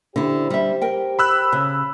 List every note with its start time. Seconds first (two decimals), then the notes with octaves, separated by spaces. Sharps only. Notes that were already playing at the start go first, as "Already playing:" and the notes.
0.16 D3 E4 G4 C5
0.50 G3 E5
0.82 A#4 G5
1.19 B5 E6 F#6
1.52 C#3